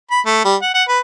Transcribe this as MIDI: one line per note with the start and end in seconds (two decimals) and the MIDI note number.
0.11 0.21 83
0.26 0.42 57
0.45 0.56 55
0.62 0.72 78
0.74 0.83 78
0.89 1.00 71